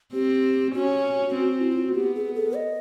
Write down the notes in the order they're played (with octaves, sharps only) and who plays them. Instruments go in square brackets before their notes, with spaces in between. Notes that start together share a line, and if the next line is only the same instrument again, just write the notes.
[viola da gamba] C4 [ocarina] G4
[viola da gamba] C#4 [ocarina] F#4
[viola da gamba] C4
[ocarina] E4
F4
F#4
[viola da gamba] B3 [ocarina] G4
[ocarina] G#4
A4
D#5